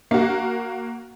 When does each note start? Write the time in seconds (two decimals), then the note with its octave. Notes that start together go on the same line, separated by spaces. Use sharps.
0.11 A#3 F#4